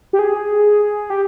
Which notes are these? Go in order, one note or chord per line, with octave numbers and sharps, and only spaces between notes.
G4
G#4
G4